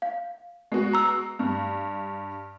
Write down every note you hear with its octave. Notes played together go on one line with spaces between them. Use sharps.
F5
G#3 B3 F#4
A#5 E6
G2